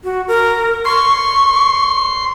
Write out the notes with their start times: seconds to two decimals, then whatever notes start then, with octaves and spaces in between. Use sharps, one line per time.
0.04 F#4
0.28 A#4
0.85 C6 C#6